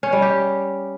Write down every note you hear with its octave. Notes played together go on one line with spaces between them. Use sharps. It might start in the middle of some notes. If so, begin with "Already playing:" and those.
C#4
G3
G4